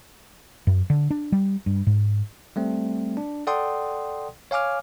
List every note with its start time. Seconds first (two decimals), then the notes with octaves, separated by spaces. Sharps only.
0.67 F#2
0.90 D3
1.10 D4
1.32 G3
1.66 G2
1.87 G#2
2.56 G3 A3 C4
3.17 D4
3.47 A4 D5 F#5 G5 C6 D#6
4.51 C#5 F5 G#5 D6 F6